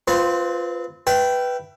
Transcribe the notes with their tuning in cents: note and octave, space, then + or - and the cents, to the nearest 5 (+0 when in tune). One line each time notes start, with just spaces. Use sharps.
C4 -20 F4 +0 B4 +0
B4 +0 E5 +25 G5 -15